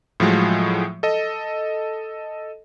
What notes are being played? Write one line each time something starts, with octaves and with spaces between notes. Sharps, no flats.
A2 F3 F#3 G#3
A4 D#5